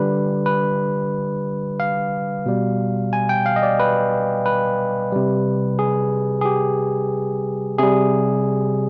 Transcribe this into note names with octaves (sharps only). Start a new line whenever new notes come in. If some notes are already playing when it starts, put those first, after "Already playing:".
Already playing: D3 G3 B4
B4
F5
B2 G3
G#5
G5
F5
D#5
D5
B4
B4
C3 G3
G#4
G#4
G4
C3 G3 G#4